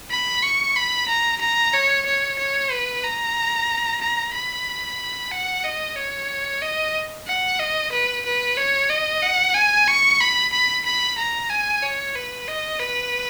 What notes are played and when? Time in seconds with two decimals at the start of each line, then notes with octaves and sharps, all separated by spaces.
0.10 B5
0.43 C#6
0.76 B5
1.08 A#5
1.41 A#5
1.73 C#5
2.06 C#5
2.38 C#5
2.71 B4
3.04 A#5
4.01 A#5
4.34 B5
5.32 F#5
5.64 D#5
5.96 C#5
6.62 D#5
7.27 F#5
7.59 D#5
7.92 B4
8.25 B4
8.57 C#5
8.90 D#5
9.23 F#5
9.54 G#5
9.88 C#6
10.21 B5
10.52 B5
10.85 B5
11.18 A#5
11.50 G#5
11.83 C#5
12.15 B4
12.48 D#5
12.80 B4